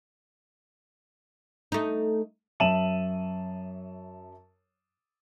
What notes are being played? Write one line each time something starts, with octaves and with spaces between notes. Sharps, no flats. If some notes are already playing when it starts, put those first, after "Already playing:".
A3 D#4
F#2 E5 A5 D#7 E7 F#7